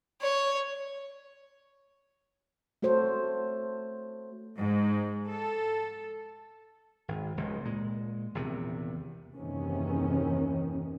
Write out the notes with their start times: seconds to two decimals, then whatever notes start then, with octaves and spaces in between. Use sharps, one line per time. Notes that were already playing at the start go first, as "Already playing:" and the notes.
0.21 C#5
2.82 A3 F#4 A4 C5 C#5
4.58 G#2
5.28 A4
7.08 G#1
7.37 F1 C#2 G#2
7.65 A#2 G#3
8.35 A#1 E2 C3 D#3
9.36 F#1 D#2 C3 D#3 E3 C#4